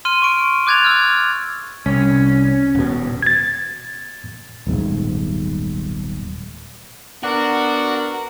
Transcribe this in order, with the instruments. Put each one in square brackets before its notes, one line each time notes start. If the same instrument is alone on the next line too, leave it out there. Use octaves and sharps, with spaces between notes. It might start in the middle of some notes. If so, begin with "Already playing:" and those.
[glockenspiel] C6 F6 D#7
C#6 D7
D6 F#6 G#6 A6 F7
E6 F6
[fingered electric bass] C2 [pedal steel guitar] C#4
[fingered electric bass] D#1 B2
[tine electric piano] G#6 A6
[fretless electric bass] D#1 B1 G#2
[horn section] B3 D4 A#4 [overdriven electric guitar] F#4